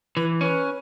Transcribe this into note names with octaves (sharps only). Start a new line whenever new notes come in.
E3 B4
C#4 B4